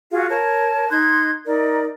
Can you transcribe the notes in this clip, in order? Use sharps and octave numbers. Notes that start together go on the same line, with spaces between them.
F4 F#4 G#4 F5
A#4 C#5 A5
D#4 C6 F#6 G#6
D#4 A#4 D5